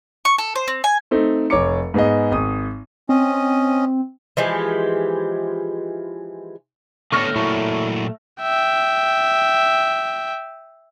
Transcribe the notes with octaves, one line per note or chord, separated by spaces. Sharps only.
C#6
A4
C5
C4
G#5
A3 C4 D#4
F1 C#5 A#5 D6 C#7
G#2 B3 G#4 D#5
G#1 D#6
C4 C#4 D#5
E3 F3 G#3 G4
D3 A3 B3 A4 C#5 C#6 F6 A#6
A#2 F#3 E4 A4
E5 G5